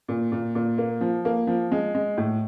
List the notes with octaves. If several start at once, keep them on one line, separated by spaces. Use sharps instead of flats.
A#2
A#2
A#2
A#3
F3
A#3
F3
G#3
G#3
A2